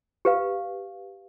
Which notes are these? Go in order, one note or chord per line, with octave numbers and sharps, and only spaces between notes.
G4 B4 F5